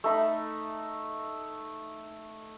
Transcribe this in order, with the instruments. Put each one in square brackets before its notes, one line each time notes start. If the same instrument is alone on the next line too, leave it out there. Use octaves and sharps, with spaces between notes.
[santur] A3 D#4 B5